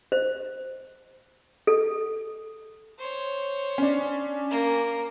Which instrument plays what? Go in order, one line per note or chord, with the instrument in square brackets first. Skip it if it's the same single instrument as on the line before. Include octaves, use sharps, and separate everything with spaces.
[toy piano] C5
A4
[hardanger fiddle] C5 C#5
[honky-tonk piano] C#4 D4
[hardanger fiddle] A#3